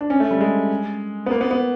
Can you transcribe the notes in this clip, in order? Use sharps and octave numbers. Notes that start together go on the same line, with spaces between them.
D4
C#4
A3
G3
G#3
B3
A#3
B3
B3